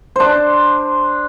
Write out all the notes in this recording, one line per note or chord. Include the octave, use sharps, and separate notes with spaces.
D4 C5